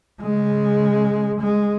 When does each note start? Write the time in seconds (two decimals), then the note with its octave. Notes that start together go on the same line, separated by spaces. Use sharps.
0.21 C#3 G#3
1.41 G#3